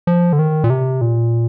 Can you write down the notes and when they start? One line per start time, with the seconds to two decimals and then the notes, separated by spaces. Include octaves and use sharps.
0.07 F3
0.33 D3
0.39 D#3
0.64 A#2
0.70 C3
1.01 A#2